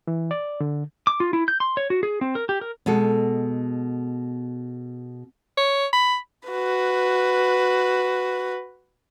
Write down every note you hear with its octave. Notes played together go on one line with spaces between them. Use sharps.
E3
D5
D3
D6
F4
E4
G6
C6
C#5
F#4
G#4
C4
A#4
G4
A#4
B2 G#3 A4
C#5
B5
F#4 B4